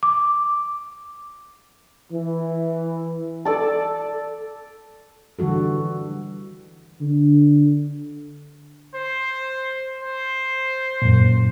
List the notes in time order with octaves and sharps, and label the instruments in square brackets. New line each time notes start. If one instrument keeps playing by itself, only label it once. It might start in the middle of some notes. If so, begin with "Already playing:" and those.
[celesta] D6
[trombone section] E3
[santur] A4 D5 A5
[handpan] D3 E3 G3 F#4 A4
[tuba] D3
[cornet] C5
C5
[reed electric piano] F#2 A#2